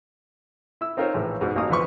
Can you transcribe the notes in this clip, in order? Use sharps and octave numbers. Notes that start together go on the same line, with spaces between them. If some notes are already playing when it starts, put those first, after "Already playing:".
E4 E6
C4 D#4 F4 A#4 C5 C#5
A#1 A2 E3
G#2 B2
A1 A#3 F#4 F5 D#6
D2 E3 F3 B4 C6 C#6